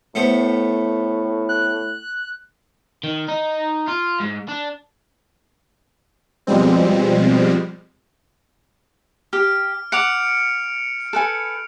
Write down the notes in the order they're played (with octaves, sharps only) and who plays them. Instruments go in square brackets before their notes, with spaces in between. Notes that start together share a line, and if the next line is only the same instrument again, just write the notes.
[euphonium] A2 [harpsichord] A3 B3 C5
[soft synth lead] F#6
[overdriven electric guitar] D#3
D#4
F4
G#2
D4
[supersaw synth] B2 F3 G3 G#3 C4
[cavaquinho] G4 [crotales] F6
[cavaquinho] F#5 D6 [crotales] C#7 D7 F7
[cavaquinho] A4 B4 G#5